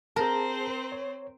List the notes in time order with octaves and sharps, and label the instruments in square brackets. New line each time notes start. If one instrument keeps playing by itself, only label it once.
[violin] C4 C5 [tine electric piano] G#4 A5 [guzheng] A#4
[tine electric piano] C#5